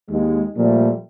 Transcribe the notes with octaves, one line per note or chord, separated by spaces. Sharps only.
D#2 G#3
A#2 F3 G3 A3